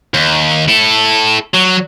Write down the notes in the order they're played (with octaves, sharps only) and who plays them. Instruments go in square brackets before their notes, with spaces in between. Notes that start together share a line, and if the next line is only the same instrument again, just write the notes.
[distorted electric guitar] D#2
E4 A4
F#3